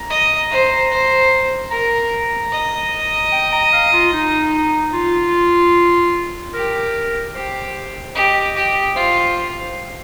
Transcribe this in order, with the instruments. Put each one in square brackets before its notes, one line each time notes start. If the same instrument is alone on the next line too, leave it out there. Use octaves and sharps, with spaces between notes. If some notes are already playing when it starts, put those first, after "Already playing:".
Already playing: [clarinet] A#5
[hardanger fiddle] D#5
C5
C5
[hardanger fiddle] A#4 [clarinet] A#5
[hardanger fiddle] D#5
[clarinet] G5
A#5
F5
F4
D#4
F4
[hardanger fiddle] G4 [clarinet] A#4
[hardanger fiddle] G4 [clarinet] C5
[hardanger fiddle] G4 [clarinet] D#5
[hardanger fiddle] G4
[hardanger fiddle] F4 [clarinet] C5